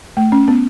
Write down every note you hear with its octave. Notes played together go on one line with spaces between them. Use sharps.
A3
C#4
B3